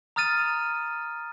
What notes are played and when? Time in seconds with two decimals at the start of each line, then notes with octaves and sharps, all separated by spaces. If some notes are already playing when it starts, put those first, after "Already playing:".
0.16 A#5 D#6 F6 A6 D#7